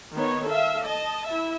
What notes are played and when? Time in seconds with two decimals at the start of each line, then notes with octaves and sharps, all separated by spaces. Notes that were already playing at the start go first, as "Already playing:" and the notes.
0.15 D#3 B3 D#4 C#5
0.46 A4 E5 F5
0.85 D#5 A5
1.26 E4 E5